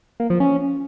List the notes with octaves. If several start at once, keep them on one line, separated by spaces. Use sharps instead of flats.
A#3
F3
C#4